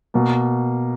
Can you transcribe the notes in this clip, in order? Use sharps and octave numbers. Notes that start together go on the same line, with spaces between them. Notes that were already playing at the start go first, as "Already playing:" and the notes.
B2 A#3